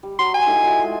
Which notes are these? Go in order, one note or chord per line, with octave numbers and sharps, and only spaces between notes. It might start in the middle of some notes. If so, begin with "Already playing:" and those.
G3
F#3 C6
G#5
A2 D#4 F#5
F4 F#4 E5
G#3 A4